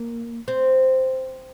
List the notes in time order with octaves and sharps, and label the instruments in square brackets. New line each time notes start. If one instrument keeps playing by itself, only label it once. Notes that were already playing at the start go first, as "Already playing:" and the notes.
Already playing: [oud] A#3
C4